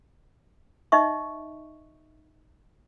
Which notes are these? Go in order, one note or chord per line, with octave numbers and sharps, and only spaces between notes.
D#4 D#5 E5 C#6